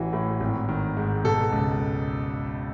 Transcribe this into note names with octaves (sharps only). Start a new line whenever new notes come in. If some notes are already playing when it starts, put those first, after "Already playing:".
Already playing: A1 E3 F#4
A2
G#1
D#3
G#2
B2 A4
C#2